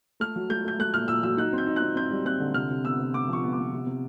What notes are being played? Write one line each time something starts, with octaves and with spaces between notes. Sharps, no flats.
A3 F6
F#3
A3 G6
A3 G6
A3 F#6
A#2 F6
A#2 E6
F#3 E6
D#4 F#6
C4
G6
D#4
F#6
C4
C4 G6
G3
C4 F#6
D3
C3 F6
C3
B3 E6
C3
B3 D6
F3
C#6
B3
D6
B3
C3
C3